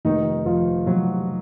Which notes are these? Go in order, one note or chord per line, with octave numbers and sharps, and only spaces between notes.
F1 D#3 D#4
F2 F3 F4
F1 F#3 F#4